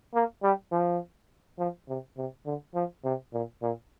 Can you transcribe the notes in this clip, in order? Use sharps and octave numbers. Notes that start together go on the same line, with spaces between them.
A#3
G3
F3
F3
C3
C3
D3
F3
C3
A#2
A#2